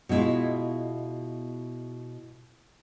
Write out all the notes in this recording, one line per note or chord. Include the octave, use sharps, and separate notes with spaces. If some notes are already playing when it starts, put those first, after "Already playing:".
B2 G#3 E4 F4